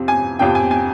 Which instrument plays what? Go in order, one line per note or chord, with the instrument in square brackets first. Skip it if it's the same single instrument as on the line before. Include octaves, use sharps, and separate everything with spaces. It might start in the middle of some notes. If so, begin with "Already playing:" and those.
Already playing: [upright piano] F2 C3 F3 C4
G#5
F2 C3 F3 C4 G5
G#5
G#5